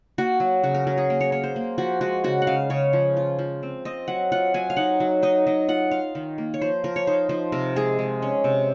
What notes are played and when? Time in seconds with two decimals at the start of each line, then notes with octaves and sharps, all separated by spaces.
0.18 A#3 F#4
0.40 F#3
0.63 C#3 F#4
0.75 A#4
0.87 F#3 A#4
0.98 G#4
1.10 A#3 A#4
1.21 C#5
1.32 A#3 C#5
1.44 C5
1.56 A#3
1.78 F3 F#4
2.01 G#3 F#4
2.24 C#3 F#4
2.42 F#5
2.47 C#3 F5
2.70 C#3 C#5
2.93 F3
3.17 F4
3.39 F3
3.63 C4
3.85 C4 D#5
4.08 F#3 F#5
4.32 F4 F#5
4.54 F#3 G#5
4.70 F5
4.77 D#4 F#5
5.00 F#3
5.22 D#4 D#5
5.47 F#3 D#5
5.68 F4 F#5
5.91 F4 F5
6.15 D#3
6.38 A#3
6.54 C#5
6.61 F3 C5
6.84 F3 A#4
6.96 C#5
7.07 D#4 C5
7.29 F3 C5
7.52 C3 A#4
7.76 G#3 G#4
7.99 G#3
8.22 C#4
8.44 C3